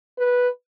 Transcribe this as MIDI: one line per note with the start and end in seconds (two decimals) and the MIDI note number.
0.18 0.49 71